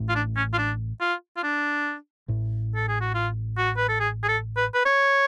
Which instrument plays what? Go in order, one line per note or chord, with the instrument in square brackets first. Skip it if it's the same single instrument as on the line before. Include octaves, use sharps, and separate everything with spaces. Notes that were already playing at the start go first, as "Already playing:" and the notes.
Already playing: [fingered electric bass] A1 A2
[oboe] F4
D4
C#4
F4
D4
F4
F4
D4
[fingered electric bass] A1 A2
[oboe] A4
G#4
F#4
F4
F#4
B4
A4
G#4
G#4
A4
B4
B4
C#5